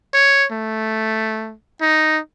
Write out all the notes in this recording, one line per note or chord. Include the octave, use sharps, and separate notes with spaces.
C#5
A3
D#4